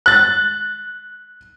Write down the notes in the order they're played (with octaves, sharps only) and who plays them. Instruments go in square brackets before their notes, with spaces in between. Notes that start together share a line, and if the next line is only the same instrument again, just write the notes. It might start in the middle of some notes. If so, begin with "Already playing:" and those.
[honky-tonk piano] F#6 A6